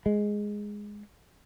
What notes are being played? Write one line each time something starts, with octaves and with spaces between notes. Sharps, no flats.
G#3